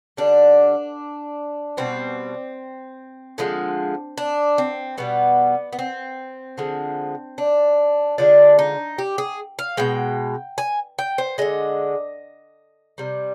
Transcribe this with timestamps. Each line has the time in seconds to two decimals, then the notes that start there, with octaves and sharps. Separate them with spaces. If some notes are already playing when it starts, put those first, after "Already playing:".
0.17 D3 G3 D4
1.77 B2 G3 C4
3.38 D3 F3 G#3
4.18 D4
4.58 C4
4.98 B2 G3 B3
5.73 B3
5.79 C4
6.58 D3 F3 G#3
7.38 D4
8.18 D3 F3 G#3 D4
8.59 D#4
8.98 G4
9.18 G#4
9.59 F5
9.77 B2 G#3 G5
10.58 G#5
10.99 G5
11.18 C5
11.38 D3 G#3 D#5
12.98 C3 G3